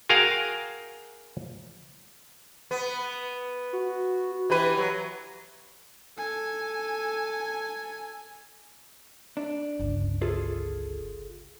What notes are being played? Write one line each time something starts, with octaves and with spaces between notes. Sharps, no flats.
F#4 G#4 A#4 F5 G5
B3
F#4
E3 G4 B4
F#3
A4 G#5
D4
G1 C#2
F4 G#4 A4